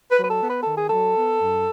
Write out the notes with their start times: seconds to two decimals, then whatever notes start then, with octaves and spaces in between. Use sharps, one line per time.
0.12 B4
0.18 F#3
0.23 B4
0.29 A4
0.42 B3
0.48 B4
0.62 D#3 A4
0.76 G#4
0.90 F#3 A4
1.16 B3
1.40 F#2